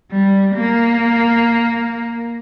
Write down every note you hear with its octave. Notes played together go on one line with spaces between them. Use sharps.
G3
A#3